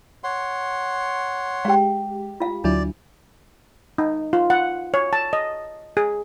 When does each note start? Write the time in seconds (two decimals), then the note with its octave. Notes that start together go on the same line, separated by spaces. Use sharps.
0.24 C#5 F#5 C6
1.65 G#3 G4 F5 G5
2.40 F4 F5
2.64 D2 F#3 D4 E4 D5
3.98 D#4
4.33 F4
4.50 F#5
4.94 C#5
5.13 A5
5.33 D#5
5.97 G#4